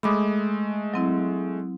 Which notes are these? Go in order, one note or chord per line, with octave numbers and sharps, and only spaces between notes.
G#3 A3 B5 D6 D#6
F#3 C4 E4